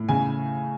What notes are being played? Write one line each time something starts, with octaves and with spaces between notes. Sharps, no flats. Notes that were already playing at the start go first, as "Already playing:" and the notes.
Already playing: A2
C#3 G#5